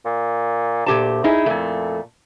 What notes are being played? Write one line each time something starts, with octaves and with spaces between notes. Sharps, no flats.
A#2
D2 A#2 G4 A5
D#4 E4 G#4
F2 A#2 A3